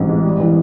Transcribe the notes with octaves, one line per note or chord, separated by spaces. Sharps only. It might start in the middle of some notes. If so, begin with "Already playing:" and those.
Already playing: A1 G#2 E3
G#3
G3
E3